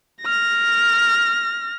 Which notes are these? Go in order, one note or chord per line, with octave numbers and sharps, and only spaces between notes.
F6 A#6